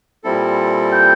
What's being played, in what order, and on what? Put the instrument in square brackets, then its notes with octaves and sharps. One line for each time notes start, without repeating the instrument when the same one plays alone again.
[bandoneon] A#2 G3 C4 E4 A4
[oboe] G5